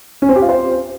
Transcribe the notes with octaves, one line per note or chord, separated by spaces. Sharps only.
C#4
C4
G4
F4
C5